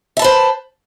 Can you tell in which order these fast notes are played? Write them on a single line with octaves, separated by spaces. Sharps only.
E5 A5 B4 C5